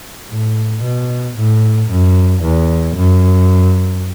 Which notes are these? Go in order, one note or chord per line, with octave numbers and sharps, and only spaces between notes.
A2
B2
A2
F#2
E2
F#2